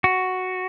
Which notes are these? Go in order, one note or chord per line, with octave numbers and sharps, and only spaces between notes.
F#4